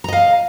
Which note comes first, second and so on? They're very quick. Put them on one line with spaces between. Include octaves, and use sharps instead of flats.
A#5 D#5 F5